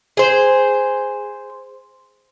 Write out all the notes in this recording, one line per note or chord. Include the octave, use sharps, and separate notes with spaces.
G#4 C5